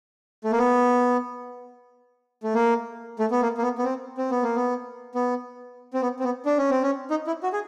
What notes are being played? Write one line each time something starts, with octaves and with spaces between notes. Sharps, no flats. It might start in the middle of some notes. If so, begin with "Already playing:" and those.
A3
A#3
B3
A3
A#3
A3
B3
A#3
A#3
B3
B3
C4
C4
B3
A#3
B3
B3
C4
B3
C4
B3
D4
C#4
C4
C#4
D#4
E4
F#4
G#4